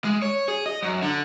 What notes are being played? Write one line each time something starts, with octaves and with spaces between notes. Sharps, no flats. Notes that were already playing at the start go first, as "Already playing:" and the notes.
G#3
C#5
G#4
D#5
F#2
D3